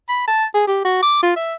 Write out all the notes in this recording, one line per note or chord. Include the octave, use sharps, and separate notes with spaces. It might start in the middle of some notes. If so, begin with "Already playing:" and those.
B5
A5
G#4
G4
F#4
D6
F4
E5